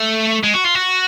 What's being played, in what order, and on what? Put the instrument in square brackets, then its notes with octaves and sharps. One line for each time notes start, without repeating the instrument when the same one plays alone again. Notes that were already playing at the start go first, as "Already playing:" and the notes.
Already playing: [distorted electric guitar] A3
G#3
F#4
F4
F#4